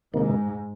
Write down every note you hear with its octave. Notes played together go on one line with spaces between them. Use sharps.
G#2 C3 D#3 A#3